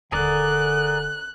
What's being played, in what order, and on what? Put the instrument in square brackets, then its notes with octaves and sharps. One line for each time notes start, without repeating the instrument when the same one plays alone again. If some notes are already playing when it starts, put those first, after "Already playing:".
[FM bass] D#1 [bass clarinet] D3 [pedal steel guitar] G#4 A#4 D5 [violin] F#6